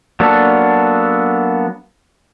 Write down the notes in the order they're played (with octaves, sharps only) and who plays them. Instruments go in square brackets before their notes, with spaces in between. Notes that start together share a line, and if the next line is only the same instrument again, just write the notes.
[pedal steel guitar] F#3 A#3 B3 D4 A4